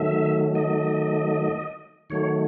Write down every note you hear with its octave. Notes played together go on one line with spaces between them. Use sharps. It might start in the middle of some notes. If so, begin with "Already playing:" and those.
Already playing: D#3 F#3 A3 E5
D#5
D#3 F#3 A3 C#5